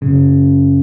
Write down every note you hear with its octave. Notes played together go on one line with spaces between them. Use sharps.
F#2 C#3